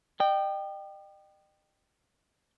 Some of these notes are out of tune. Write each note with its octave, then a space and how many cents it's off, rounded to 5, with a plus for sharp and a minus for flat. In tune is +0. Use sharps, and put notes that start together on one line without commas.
D#5 -40 G5 +0